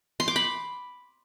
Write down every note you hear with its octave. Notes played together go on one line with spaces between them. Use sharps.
C6
D6
B5